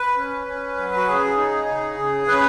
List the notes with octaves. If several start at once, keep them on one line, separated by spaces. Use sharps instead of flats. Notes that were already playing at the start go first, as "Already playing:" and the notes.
Already playing: B4
C#4
C#4
F#3
F#4
C#3 G#4
D#4
C#3
C#3
C#3 B4